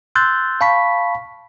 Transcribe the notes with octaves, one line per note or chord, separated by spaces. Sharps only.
C6 E6 F#6 G6 A6
F5 A5 B5 C#6 B6